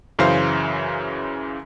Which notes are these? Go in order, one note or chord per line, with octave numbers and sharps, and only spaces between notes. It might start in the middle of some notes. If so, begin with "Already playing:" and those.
F#2 C#3 E3 C5 F5